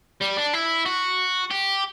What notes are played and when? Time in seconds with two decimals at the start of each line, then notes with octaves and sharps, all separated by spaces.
0.21 G3
0.37 D4
0.54 E4
0.86 F#4
1.51 G4